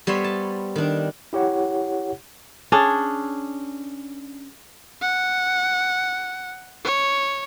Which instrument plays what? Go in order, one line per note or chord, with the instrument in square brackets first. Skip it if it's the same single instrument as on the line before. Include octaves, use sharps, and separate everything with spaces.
[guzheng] G3 B3 C5 C#5 E5
A5
D#3 D4
[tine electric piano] E4 G4 C#5 F#5
[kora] C#4 D4 G#4
[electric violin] F#5
C#5